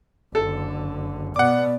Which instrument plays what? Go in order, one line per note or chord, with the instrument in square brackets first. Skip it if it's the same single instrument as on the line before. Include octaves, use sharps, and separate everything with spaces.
[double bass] F#1 D3 [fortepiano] A4
[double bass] B2 B3 [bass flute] D5 [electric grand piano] F#5 D6